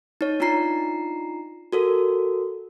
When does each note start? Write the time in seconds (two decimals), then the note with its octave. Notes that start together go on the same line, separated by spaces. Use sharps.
0.21 D#4 C#5
0.40 D4 D#4 F4 A#5 C7
1.72 F#4 A4 A#4